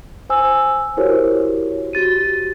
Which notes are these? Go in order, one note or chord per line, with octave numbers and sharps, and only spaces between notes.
C5 G#5 E6
E4 F#4 G4 A#4 C5 C#5
F#4 G4 A6 D#7